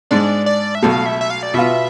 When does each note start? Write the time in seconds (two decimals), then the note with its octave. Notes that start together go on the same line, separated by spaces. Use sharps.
0.11 G#2 G#3 D4 D5
0.46 D5
0.75 E5
0.83 B1 B2 A3 F5
1.06 E5
1.21 E5
1.30 F5
1.43 D5
1.54 B2 B3 F4 E5